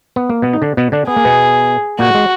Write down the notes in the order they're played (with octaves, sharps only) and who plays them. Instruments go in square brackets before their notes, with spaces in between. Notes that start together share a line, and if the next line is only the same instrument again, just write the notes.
[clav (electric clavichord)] B3
A#3
B2 B3
D#4
D3 D4
B2 B3
D3 D4
[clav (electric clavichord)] B3 [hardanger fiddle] G#4
[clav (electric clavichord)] A#3
B2 B3
[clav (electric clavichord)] A#2 A#3 [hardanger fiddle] F#4
[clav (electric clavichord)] G#3